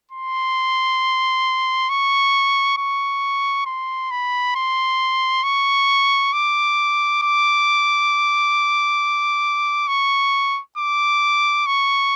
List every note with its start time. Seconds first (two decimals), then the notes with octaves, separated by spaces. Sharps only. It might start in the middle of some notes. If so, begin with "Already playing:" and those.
0.11 C6
1.89 C#6
2.78 C#6
3.66 C6
4.11 B5
4.55 C6
5.43 C#6
6.33 D6
7.22 D6
9.88 C#6
10.77 D6
11.66 C#6